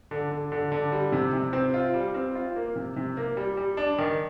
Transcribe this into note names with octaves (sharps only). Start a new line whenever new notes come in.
D3
D3
D3
D3
G3
C3
C3
C4
F4
G3
C4
F4
A#3
C3
C3
A#3
G3
G3
D4
D#3